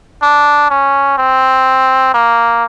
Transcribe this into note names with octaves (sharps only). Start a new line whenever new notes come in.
D4
C#4
C4
A#3